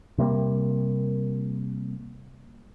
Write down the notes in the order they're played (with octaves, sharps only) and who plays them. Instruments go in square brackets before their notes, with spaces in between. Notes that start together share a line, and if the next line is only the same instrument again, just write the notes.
[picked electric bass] C3 G3 A#3